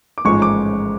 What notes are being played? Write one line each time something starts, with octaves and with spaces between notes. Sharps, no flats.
D6
A1 G#2 F3 G#3 C#6
D6